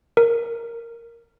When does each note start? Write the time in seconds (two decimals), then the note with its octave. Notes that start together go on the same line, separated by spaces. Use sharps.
0.17 A#4